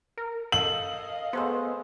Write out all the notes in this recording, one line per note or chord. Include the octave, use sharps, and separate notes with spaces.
A#4
A4 D#5 F5 F#7
G#3 A3 B3 C5